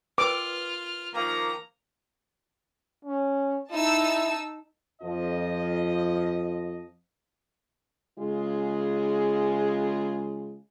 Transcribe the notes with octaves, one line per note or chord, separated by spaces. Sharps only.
F4 A#4 B4 D6 F6
D#3 F3 A#3 A#5
C#4
D#4 E4 A5 E6
F2 F3 D#5
C#3 G#3 F4 G#4